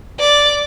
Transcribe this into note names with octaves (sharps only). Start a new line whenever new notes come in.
D5